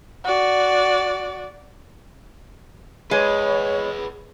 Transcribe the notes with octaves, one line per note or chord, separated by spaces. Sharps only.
F#4 D5
G#3 G#4 B4 C#5